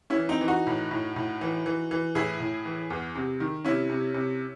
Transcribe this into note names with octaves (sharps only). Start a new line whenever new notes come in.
C#4 E4
E3
C4 D#4
E3
D#4 F#4
A2
A2
A2
E3
E3
E3
A2 E4 G#4
A2
E3
E2
C3
D#3
C3 C#4 E4
C3
C3